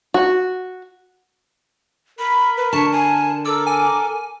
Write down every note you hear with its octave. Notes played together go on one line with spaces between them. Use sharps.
F#4
A#4 B5
B4
D3 A5 C#6
G#5
A4 A#4 D6 E6
G#5